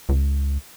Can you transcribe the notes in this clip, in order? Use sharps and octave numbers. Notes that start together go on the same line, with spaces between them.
C#2